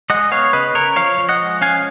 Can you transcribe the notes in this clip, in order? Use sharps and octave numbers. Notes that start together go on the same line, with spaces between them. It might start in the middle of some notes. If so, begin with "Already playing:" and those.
G#3 D#5 F#5
B3 C#5 F5
C#3 B4 D#5
C#3 A#4 C#5
F3 C#5 F5
F3
D#5 F#5
G#3
C#4 F5 G#5